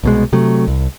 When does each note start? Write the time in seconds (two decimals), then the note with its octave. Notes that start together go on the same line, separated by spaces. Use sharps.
0.04 C2 B2 G#3
0.33 C3 F#3 A3
0.67 C2